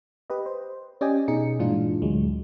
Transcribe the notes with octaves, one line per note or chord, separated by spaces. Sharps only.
G4 B4 D#5
C5
C#4 G4 D5 D#5 G5 G#5
B2 D#4 G#4 C#7
G2 A#2 E3 G#3 D4 F4
D2 F#3 G#3